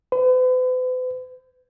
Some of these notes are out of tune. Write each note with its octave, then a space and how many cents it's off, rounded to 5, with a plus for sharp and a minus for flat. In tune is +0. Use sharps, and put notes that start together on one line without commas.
B4 +45